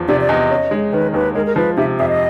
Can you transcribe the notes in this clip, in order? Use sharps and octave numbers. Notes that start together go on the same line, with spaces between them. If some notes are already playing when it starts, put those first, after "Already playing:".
Already playing: E2 F3
C3 D5
D5
E2 D#5
C#4
G#3
D#3 B4
D#2 B4
G#3 A#4
A#4
F3 B4
C3 E5
F2 E5
D#5